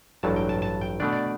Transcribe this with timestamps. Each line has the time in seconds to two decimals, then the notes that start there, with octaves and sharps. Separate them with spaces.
0.23 A1 G2 F#3 A5
0.36 G5
0.49 A5
0.62 A5
0.81 G5
1.00 B2 A3 D4 D5
1.13 D5